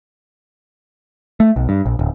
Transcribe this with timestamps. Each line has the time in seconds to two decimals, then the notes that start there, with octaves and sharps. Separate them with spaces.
1.40 A3
1.56 B1
1.69 G2
1.86 A#1
1.99 D1